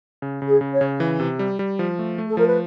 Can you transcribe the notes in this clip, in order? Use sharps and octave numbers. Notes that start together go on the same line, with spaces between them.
C#3
C#3
G#4
C#3
C#5
C#3
E3
C3
G3
G3
F3
A3
A3
A4
F3 A#4
B4